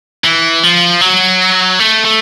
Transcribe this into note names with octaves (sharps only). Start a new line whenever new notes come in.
E3
F3
F#3
A3
A3